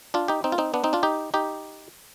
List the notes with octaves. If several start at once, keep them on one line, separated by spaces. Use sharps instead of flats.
D4 F4
D#4 G4
C4 D#4
F4
C4 D#4
B3 D4
C4 D#4
D4 F4
D#4 G4
D#4 G4